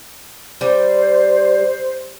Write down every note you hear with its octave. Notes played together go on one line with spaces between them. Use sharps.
G3 C5